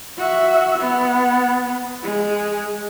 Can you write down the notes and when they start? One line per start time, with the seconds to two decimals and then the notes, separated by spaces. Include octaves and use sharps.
0.17 F#4 E5
0.78 B3
2.03 G#3